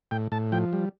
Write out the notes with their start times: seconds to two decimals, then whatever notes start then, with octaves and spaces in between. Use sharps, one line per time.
0.11 A2 G5
0.32 A2 A5
0.52 F3 G5
0.73 G3